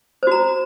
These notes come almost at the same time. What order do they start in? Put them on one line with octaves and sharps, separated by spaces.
C5 F#4 A#5